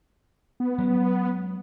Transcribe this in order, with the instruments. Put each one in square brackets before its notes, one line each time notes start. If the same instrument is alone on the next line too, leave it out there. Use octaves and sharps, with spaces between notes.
[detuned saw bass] B3
[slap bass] F#3 G#3 C#4